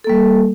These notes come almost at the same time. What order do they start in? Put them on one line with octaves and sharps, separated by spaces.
A4 A#3 G3